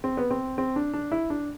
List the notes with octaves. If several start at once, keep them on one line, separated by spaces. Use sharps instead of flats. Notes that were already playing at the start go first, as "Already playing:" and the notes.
C4
B3
C4
C4
D4
D4
E4
D4